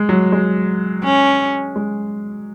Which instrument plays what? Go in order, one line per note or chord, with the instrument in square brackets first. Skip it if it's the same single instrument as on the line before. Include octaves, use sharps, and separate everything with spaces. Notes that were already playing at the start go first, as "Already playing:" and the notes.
Already playing: [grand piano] G#3
F#3
G#3
[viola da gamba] C#4
[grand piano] G#3